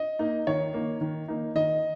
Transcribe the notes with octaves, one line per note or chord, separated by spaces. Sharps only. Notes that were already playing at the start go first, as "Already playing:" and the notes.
Already playing: D#5
A#3 D#4
D#3 C#5
A#3 D#4
D#3
A#3 D#4
D#3 D#5